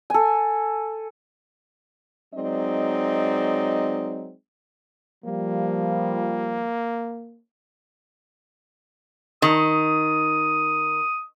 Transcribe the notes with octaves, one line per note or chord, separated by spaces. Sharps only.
A4 G#5
F#3 G#3 C4 D#4 D5 D#5
F3 G3 A#3
D#3 D#6